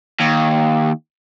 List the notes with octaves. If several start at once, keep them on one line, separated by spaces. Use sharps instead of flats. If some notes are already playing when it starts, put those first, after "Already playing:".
D#2